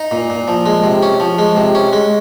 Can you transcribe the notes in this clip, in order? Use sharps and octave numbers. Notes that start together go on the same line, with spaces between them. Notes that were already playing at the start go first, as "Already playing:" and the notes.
Already playing: D#4
A#2
A#2
F3
G#3
C3
C#4
F3
G#3
C3
C#4
G#3